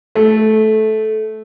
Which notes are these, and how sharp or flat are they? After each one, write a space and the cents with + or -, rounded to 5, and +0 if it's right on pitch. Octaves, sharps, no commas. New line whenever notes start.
A3 -15